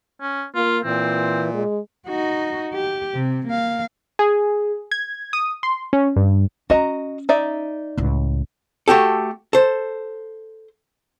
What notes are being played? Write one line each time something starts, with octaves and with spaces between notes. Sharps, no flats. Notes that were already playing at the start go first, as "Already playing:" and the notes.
C#4
A#3 F4
A#2 E3 C4
G#3
D#4 F#4
G4
C3
A#3 F5
G#4
G#6
D#6
C6
C#4
G2
C#4 F#4 D#5 A#5
D#4 D5 E5
C#2 A2
A3 F#4 G4 A4
A4 C5